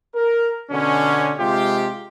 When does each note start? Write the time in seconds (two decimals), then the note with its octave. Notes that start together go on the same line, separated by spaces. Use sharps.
0.15 A#4
0.71 B2 D3 C#4
1.39 C3 G#3 F4 G4